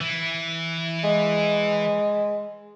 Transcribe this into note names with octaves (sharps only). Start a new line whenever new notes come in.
E3
G#3